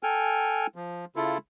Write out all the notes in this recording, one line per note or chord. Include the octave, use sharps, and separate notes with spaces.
A4 G5 G#5 F6
F3
C#3 E4 F4 A4